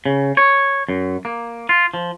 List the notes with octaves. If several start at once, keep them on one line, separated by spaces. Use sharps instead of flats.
C#3
C#5
F#2
A#3
F4
F3